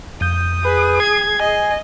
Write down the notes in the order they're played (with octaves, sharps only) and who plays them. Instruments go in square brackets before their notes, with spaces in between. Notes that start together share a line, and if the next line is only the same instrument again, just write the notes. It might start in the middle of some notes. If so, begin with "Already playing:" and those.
[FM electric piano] F2 G6 [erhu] D#6
[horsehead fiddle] G#4 [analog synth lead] B4
[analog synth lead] G#6 [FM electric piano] C7
[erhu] D#5 [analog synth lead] G#5